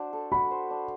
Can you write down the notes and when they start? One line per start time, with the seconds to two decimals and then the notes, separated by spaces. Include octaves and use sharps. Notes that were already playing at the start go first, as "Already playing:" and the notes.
Already playing: D4 F#4 C5
0.13 A4
0.32 F#4 B5
0.51 C5
0.70 D4